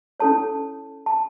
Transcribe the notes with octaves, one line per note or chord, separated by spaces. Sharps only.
C#4 E4 A4 C#5 A5
A5